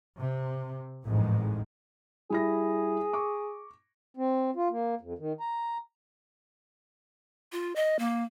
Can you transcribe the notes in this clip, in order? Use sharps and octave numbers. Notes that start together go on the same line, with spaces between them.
C3
A1 F2 G#2 D#3 G#3
G3 E4 G#4 A#6
C#6 D6
C4
F4
A#3
F2
D#3
A#5
F4
D#5
A#3